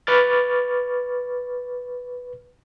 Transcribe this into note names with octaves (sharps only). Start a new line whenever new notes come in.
B4 C#6 D6 F6 A6